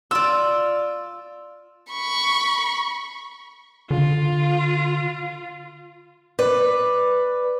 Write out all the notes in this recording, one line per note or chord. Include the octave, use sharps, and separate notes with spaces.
F4 D5 E6
B5 C#6
D3 F4
B4 D5